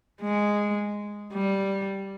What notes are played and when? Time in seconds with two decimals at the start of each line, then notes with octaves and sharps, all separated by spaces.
0.22 G#3
1.33 G3